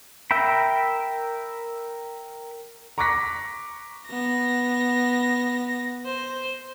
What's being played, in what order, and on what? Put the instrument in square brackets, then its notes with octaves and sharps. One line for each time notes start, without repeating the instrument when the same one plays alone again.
[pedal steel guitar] A#4 E5 G5 B5
[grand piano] A#5 C#6 D6 F#6 A#6 B6
[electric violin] B3 A#6
C5